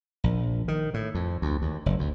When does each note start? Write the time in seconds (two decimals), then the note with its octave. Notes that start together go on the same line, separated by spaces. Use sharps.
0.24 A#1
0.68 D#3
0.94 A2
1.15 F2
1.42 D2
1.62 D#2
1.86 F#1
1.99 D2